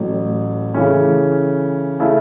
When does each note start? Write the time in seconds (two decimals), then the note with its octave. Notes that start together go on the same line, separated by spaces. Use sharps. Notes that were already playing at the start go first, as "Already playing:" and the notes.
Already playing: A1 A2 F#3 A3
0.74 C#3 E3 A3 C#4
2.00 C#3 A3 C#4 E4 A4